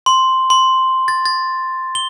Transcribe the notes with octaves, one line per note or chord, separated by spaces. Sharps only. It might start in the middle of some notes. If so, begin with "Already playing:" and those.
C6
C6
A6
A6
G7